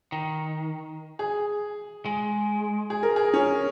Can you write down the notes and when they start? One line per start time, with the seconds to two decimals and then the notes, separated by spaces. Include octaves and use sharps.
0.12 D#3
1.19 G#4
2.06 G#3
2.90 G#4
3.03 A#4
3.16 G#4
3.34 C#4